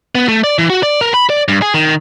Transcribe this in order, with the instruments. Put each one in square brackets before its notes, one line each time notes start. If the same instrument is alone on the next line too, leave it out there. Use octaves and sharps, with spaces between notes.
[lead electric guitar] B3
A3
D5
E3
F#4
D5
A#4
B5
D5
G2
G#4
D#3